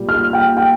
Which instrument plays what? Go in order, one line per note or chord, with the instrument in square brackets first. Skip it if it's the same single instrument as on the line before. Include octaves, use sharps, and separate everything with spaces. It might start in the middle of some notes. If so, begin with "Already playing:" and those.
Already playing: [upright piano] A#2 G3
F6
G5
G5